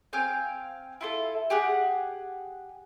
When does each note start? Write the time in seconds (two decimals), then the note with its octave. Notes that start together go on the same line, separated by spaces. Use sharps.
0.13 C4 F5 G5 G#5
1.01 E4 F4 A4
1.50 G4 G#4 F#5